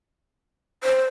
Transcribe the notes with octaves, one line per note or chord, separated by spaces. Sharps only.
C5